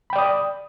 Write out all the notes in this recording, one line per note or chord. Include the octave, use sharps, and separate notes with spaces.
D5 G5 B5 D#6